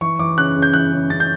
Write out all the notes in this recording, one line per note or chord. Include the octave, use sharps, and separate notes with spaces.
E3 C#6
E3 D6
C#3 F#6
C#3
G6
E3 F#6
C#3
C#3 A6
G6